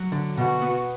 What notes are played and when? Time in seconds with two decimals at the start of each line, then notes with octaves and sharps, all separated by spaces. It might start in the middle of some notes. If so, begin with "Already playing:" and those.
Already playing: F#3
0.12 D3
0.38 B2 F#4
0.62 B3